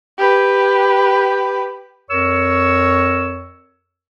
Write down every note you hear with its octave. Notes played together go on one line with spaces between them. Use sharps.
G4 B4
F2 A#4 C#5 C#6 E6